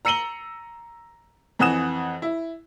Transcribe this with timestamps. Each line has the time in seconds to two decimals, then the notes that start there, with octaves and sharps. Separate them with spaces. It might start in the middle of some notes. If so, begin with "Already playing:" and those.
0.05 A#5 E6 C#7 D#7 F#7 G7
1.59 F2 E3 F#5 D#6 E7
2.22 E4